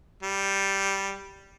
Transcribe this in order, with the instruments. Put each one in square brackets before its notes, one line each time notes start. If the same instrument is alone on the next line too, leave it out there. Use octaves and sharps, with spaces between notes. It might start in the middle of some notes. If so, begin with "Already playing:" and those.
[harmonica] G3